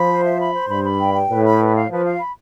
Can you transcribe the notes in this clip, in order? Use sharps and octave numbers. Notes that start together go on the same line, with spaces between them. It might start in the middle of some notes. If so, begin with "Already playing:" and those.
Already playing: F3 B5
C5
E5
B5
C5
G2 B5
B5
G5
G5
A2 B4
B5
B4
F5
F3 B4
F5
B5